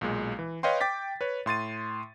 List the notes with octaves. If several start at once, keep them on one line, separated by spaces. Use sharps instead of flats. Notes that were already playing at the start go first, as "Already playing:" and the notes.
B1 A#2 G#3
E3
B4 C#5 D#5 F5 G5 C6
G5 D6 A6 B6
B4 C#5
A2 C6 A6 D#7